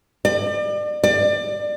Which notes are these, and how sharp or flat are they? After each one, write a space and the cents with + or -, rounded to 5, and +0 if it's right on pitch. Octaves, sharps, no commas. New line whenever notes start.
D5 +35
D5 +25